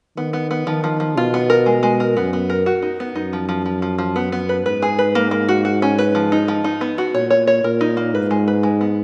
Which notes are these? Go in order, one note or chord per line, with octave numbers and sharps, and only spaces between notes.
D#3 B3
B3
B3
D#3 F3
F3
F3
B2 F4
B3
A#4
G#3
G#3
A#4
F#2 B3
B3
A#4
F#4
D#4
B3
F#2 D#4
F3
F3
F3
F3
F3
B3
B3
B4
G#2 B4
G#4
B4
A#3
A#3
F#4
F#4
C#4
B4
F3
D#4
F3
D#4
B3
F#4
A#2 C#5
C#5
C#5
A#2 A#4
D#4
A#3
G#2 B4
G#3
B4
G#3
B3